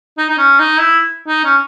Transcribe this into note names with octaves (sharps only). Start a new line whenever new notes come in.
D#4
D#4
C#4
D#4
E4
D#4
C#4